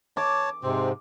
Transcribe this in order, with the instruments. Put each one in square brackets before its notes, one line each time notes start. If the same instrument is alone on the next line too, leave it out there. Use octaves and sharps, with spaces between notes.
[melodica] C#5 A5 [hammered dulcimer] D6
[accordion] G#2 C3 [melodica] C4